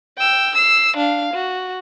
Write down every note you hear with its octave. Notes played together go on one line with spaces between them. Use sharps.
G5 E6
E6 C7
D4 F5
F#4